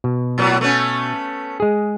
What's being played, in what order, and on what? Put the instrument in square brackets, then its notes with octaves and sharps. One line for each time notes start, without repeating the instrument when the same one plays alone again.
[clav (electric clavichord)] B2
[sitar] A2 F#3 B3
A3 B3 C#4
[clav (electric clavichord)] G#3 G#4